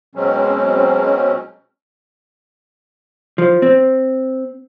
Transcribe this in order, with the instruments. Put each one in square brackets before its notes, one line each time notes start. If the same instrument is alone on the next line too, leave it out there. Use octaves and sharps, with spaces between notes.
[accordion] B2 F#3 G#3 C4 C#4
[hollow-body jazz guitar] F3
C4